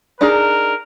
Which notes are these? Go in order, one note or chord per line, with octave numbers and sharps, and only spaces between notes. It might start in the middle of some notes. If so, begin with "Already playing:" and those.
D4 D#4 G#4 A#4